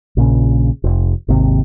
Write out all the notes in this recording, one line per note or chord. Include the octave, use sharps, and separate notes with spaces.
A#1 A#2 C#3
F1
G#1 D#2 C3